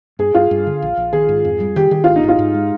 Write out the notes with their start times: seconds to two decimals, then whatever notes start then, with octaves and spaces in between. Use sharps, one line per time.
0.19 G2 G#4
0.34 G2 F4
0.51 G2
0.67 D3
0.82 A#1
0.97 A#1
1.13 D#3 G#4
1.29 G#2
1.45 F2
1.60 G3
1.76 D#3 G4
1.91 D#3 G4
2.04 G#1 F4
2.16 D#4
2.24 G#2 F4
2.39 G#2
2.54 G#3